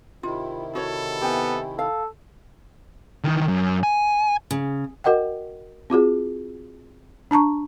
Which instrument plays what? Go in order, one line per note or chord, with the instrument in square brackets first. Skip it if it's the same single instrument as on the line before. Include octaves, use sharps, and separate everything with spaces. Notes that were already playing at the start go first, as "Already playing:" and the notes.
[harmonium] C3 D#3 E4 [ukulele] F4
[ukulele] F#4 C#5 [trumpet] A4
[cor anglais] B3 [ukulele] G4 G#5
[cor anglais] A4 [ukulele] F5
[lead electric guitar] D#3 E3
F#2
G#5
[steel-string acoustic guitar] C#3
[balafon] F#4 A#4 D#5 F#5 G5
C4 F4 F#4 G#4
D4 A5 A#5 C#6